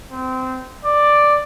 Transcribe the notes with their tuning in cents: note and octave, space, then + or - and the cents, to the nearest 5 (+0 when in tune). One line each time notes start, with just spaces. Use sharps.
C4 -20
D5 +5